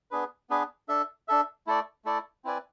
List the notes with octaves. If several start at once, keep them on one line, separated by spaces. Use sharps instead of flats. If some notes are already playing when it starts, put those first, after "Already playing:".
B3 D4 G#4 B4
B3 D4 G#4 B4
D4 A4 E5
D4 A4 E5
A3 E4 A4 D5
A3 E4 A4 D5
C4 E4 B4 D5 G#5